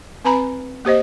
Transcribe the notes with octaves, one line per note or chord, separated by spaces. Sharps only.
C4 B4 G#5 A#5 B5
A#3 G4 C5 D#5